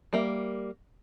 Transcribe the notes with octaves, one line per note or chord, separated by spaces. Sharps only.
G3 A#3 E5